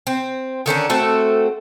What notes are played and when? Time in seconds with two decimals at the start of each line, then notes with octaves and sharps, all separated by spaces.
0.07 C4
0.66 D3 D#3 C#4 D4
0.90 A3 C4 F#4 A4